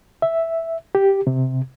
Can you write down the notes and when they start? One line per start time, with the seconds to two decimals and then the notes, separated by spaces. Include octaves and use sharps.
0.22 E5
0.95 G4
1.27 C3